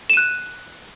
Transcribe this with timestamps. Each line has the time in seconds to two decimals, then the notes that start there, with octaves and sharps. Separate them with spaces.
0.10 E7
0.13 D#7
0.17 F#6